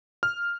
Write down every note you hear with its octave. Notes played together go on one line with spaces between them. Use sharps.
F6